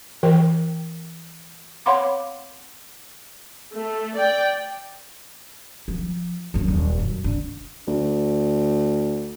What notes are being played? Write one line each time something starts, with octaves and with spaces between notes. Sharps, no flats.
E3 A#4 G5
C#5 F5 F#5 B5 C6 D6
A3
D5 G5
F3
A#1 F#2
D#1
F#2
D3
D2